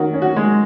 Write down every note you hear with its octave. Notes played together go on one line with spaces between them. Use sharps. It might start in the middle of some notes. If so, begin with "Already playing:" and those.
Already playing: D#3 C#4 F#4
C#4
F#4
G#3